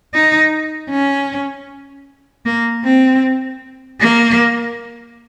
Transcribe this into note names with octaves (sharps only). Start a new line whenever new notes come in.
D#4
C#4
A#3
C4
A#3